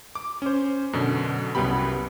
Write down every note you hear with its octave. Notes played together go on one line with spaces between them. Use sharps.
D6
C#4 C5
F#2 B2 D3
C2 F#2 B3 G4 B5